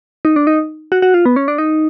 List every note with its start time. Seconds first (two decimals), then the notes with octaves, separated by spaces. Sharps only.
0.25 D#4
0.36 D4
0.47 D#4
0.92 F#4
1.02 F#4
1.14 F4
1.26 B3
1.36 C#4
1.48 D4
1.58 D#4